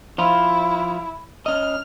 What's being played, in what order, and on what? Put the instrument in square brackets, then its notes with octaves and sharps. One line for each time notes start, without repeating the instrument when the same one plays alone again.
[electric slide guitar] F3 F4 [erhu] E4
[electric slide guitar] C#4 D#5 [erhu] F6